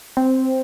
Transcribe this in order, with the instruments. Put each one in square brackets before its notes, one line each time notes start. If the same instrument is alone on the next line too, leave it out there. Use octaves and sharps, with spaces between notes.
[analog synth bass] C4